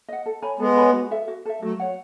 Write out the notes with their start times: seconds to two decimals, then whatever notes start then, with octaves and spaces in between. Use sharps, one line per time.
0.08 D#5 F#5
0.26 A4
0.42 C#5 G#5 B5
0.59 G#3 B3 A4
0.76 C#5 G#5 B5
0.93 F#4
1.11 A4 E5
1.28 F#4
1.45 A4 E5
1.62 F#3 A3 F#4
1.80 C#5 F#5